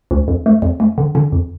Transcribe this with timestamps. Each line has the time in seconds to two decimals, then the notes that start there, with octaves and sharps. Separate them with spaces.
0.11 D2
0.28 F2
0.46 A3
0.62 F2
0.80 A3
0.98 D3
1.15 D3
1.32 F2